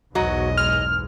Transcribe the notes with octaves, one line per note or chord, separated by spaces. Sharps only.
B1 E2 G#2 F#3 F#4 D#5
G#3 F6